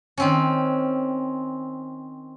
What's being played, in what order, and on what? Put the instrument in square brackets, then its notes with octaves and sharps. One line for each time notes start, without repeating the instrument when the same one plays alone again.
[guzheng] D#3 C4 C#4